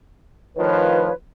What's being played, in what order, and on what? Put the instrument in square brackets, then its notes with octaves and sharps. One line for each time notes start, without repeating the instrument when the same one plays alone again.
[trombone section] A2 D#3 F3 [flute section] F4 B4 C#5